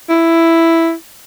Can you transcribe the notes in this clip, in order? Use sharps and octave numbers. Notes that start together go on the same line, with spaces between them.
E4